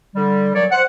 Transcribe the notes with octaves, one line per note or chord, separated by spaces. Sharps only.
D3 G3
A#2 F#3 C#5 D5
C5 F#5